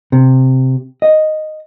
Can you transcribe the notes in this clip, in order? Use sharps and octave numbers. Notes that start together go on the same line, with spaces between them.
C3
D#5